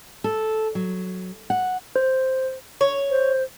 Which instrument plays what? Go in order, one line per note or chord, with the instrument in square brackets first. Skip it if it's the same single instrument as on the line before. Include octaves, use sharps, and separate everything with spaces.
[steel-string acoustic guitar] A4
F#3
F#5
[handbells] C5
[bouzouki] C#5
[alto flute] C5